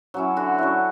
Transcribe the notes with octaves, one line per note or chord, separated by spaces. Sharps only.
F#3 C#4 E4
D3 F#4
F#3 C#4 E4